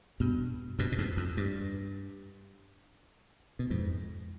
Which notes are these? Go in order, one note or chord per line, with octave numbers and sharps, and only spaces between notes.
G2 B2
G2 B2
B2
F2 G#2
F2
G2
B2
F2 G#2